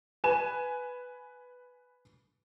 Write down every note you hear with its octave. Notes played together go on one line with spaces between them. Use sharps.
B4 G#5 E7